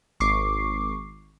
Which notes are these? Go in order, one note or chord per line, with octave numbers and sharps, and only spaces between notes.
G#1 C#6 D6 C7